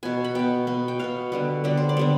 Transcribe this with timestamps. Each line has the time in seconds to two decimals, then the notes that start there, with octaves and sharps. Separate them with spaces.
0.03 B2 B3 G#5
0.24 B5
0.35 B2 B3 G5
0.67 B2 B3
0.88 G5
0.99 B2 B3 F5
1.32 D3 G3 B3
1.64 D3 G3 B3 D5
1.77 C5
1.89 D5
1.97 D3 G3 B3